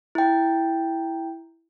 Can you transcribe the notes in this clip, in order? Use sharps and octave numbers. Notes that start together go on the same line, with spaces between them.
E4 G5